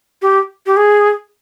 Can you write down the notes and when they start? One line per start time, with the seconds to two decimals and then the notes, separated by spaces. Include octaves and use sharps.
0.22 G4
0.66 G4
0.77 G#4